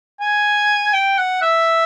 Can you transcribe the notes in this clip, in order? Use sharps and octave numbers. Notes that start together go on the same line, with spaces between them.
G#5
G5
F#5
E5